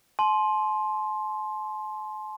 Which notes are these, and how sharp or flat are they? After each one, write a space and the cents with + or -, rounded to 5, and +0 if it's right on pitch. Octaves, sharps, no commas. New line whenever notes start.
A5 -45 C6 +5